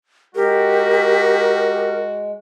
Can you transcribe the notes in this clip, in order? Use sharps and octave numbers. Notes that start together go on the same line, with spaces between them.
G#3 F#4 G4 A#4